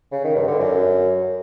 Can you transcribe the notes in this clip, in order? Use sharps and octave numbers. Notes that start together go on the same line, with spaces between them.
C#3
D#3
G2
D3
F#2